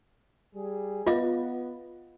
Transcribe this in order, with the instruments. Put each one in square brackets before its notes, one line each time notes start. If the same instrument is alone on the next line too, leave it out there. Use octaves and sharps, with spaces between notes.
[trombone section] G3 G#4
[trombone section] B3 [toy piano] F4 D#5 F5